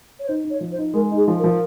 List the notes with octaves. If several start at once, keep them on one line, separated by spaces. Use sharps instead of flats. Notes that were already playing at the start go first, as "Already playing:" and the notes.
C#5
D#4 C5
D#4
C#5
F3
C5
D#4
G#3 A#4
D#4
G#4
F3
A#4
F3